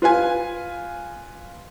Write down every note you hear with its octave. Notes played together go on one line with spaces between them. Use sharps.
F4 B4 F5 G#5